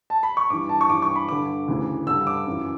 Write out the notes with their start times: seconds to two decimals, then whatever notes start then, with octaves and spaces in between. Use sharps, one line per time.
0.10 A5
0.23 B5
0.37 C#6
0.50 G2 E3 D6
0.69 A5
0.81 C#6
0.89 G2 E3 D6
1.02 C#6
1.16 B5
1.29 G2 D3 D6
1.68 D2 C#3 E3
2.07 G2 D3 E6
2.27 D6
2.47 F#2 E3